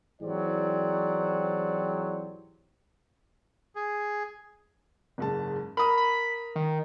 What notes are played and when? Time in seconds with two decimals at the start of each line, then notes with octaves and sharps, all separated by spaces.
0.21 G#2 E3 F#3 C4 G4 D5
3.76 G#4
5.18 F#1 G#2 A5
5.77 A#4 B5 D#6
5.97 B5
6.56 D#3